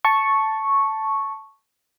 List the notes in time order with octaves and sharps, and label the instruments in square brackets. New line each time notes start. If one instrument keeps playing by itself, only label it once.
[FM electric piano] A5 C#6